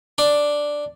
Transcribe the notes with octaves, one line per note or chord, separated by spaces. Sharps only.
D4